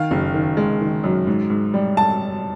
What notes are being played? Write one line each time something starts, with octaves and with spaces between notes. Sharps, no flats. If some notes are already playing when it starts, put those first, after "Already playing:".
Already playing: D#3 F5
F#1
D#3
G#3
D#3
F#2
G#2
G#2
G3
A5